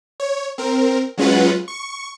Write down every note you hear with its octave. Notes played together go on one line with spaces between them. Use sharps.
C#5
C4 A#4
F#3 G#3 C#4 F4 B4 F#5
C#6